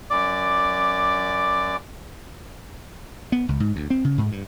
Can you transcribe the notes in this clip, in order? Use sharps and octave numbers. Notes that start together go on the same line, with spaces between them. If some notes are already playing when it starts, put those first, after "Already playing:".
F#2 D5 D6
B3
C#2
G#2
D2
C4
C#3
G#2
G2